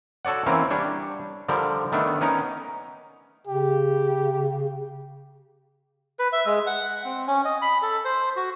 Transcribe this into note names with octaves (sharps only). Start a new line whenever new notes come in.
F#4 A4 C#5 D5 F#5
E3 A#3 C4 C#4 A#4
G3 D4 C#5
D3 F3 G3 A#4
D#3 A3 B3 D4
B3 C#4 D#4 A#4
C#3 G4
B4
E5
G#3
F#5
C4
C#4
D#5
B5
A4
C5
F#4